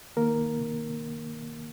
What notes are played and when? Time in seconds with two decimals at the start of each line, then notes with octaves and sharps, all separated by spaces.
0.17 D#3 A#3 A#4
0.38 C2
0.59 C3